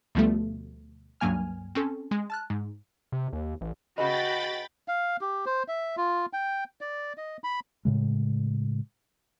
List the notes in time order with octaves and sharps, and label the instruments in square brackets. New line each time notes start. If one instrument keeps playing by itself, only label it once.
[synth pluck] D2 B2 F3 G3 A3
C#2 G2 F#3 A#3 G#5 F6
C4 C#4 A4
G#3
A5 F6 F#6
G#2
[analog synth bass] C3
D#2
A1
[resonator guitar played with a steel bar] C#3 G#4 B4 [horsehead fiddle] F#4 [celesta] D#5 [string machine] G5 B5 A6
[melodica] F5
G4
C5
E5
F4
G5
D5
D#5
B5
[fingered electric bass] A2 C#3 G#3